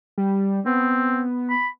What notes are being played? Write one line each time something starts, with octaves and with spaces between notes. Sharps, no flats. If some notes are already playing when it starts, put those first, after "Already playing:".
G3
B3 C4
B5